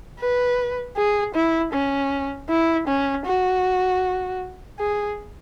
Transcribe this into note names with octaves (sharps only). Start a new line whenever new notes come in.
B4
G#4
E4
C#4
E4
C#4
F#4
G#4